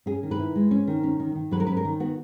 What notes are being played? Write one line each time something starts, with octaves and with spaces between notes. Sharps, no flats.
C#4 G#4
D#3
B4
E4
G#3
C#4
D#3
C#4
D#3
D#3
F#3 B4
A#4
C#4 B4
A#4
D#3
B3 F#4